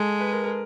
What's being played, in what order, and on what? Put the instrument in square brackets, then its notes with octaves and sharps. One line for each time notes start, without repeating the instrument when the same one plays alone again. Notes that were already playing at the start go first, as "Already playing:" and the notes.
Already playing: [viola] G#3 [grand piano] A4
[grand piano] B4
A#4
A#4